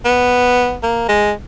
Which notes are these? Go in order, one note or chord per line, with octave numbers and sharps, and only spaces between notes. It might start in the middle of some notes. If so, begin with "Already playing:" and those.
B3
A#3
G#3